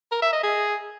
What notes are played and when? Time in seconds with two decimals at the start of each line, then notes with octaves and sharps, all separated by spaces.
0.12 A#4
0.22 E5
0.33 D#5
0.43 G#4